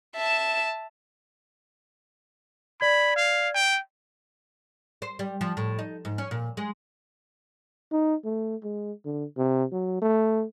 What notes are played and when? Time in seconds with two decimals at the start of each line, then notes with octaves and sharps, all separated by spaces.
0.16 E5 A5
2.81 D5 B5 G#6
3.16 F5
3.54 G5
5.02 C5
5.19 G3
5.41 F3
5.57 A2
5.79 D#4
6.05 G#2
6.18 C#4
6.31 A#2
6.57 G#3
7.92 D#4
8.25 A3
8.64 G#3
9.06 D3
9.37 C3
9.72 F#3
10.02 A3